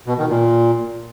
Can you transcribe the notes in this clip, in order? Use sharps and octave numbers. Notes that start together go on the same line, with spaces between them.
B2
D#3
A#2